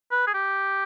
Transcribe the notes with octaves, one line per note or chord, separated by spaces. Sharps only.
B4
G#4
G4